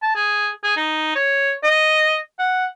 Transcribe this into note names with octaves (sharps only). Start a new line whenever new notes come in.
A5
G#4
G#4
D#4
C#5
D#5
F#5